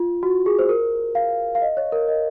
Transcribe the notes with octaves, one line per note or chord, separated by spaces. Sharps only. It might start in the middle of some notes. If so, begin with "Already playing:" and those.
Already playing: F4
F#4
G#4
C5
A#4
F5
F5
D#5
C#5
A#4
D#5